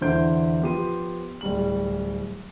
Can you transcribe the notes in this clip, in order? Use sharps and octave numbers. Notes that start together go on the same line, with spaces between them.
E2 D3 E4 C5 G6 D7
F3 B3 G4 C6 D#7
D1 G3 F#7